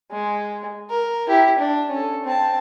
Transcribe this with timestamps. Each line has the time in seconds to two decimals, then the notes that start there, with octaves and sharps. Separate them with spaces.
0.11 G#3
0.90 A#4
1.28 E4 G4
1.59 D4
1.90 C#4 A4
2.24 C4 A5